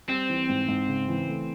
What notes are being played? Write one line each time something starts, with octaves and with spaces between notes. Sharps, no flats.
G3 C4
E3
G#2
G#2
C#3
E3
A3